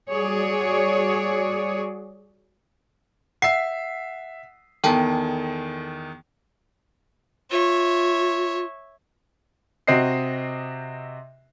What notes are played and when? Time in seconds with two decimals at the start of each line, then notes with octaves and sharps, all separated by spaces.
0.10 G3 F#4 G#4 C#5 D5
3.42 E5 F#5 C7
4.84 E2 D#3 A4 G5 A5
7.51 F4 C#5 E5
9.87 C3 C4 F#4 D#5 C7